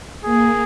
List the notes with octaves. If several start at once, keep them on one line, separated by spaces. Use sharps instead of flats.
A#3 G#4